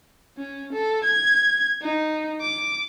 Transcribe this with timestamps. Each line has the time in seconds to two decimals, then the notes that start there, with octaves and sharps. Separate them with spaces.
0.37 C#4
0.73 A4
1.04 G#6
1.82 D#4
2.41 D6